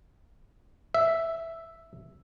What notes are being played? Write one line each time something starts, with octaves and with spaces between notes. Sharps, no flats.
E5